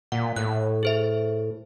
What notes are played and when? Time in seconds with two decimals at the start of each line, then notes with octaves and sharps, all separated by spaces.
0.12 A#2 F#5
0.36 A2 F#6
0.83 G#4 C5 E5